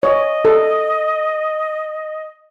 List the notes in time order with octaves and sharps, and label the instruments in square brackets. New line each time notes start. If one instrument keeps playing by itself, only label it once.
[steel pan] C#5 [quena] D#5
[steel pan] A4